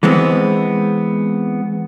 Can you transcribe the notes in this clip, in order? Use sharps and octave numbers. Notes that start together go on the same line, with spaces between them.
E3 G#3 B3 C4